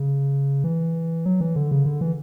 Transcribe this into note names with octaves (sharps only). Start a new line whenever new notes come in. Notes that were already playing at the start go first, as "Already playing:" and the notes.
Already playing: C#3
E3
F#3
E3
D3
C#3
D3
E3